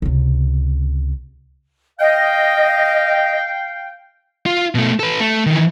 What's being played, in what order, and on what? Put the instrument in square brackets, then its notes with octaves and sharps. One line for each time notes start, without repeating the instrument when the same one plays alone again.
[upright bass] C#2 C3
[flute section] D#5 [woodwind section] F5 G5
[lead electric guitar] F4
B2 A3
A4 B4
A3
D#3 E3